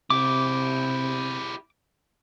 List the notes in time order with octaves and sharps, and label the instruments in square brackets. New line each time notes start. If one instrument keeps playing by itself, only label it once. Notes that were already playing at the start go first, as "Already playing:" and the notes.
[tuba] C3 [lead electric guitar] E4 G4 [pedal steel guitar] D6